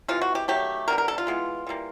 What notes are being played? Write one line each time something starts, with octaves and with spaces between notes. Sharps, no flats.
C3 E3 G#3 F4
F#4
G4
D#3 F#3 A3 G4
D3 G3 B3 A#4
A#4
A4
F4
E3 G#3 B3
E3 G3 A#3